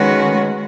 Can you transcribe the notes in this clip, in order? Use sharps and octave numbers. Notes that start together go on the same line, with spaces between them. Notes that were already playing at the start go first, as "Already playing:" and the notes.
Already playing: D#3 G#3 C#4 F#4 B4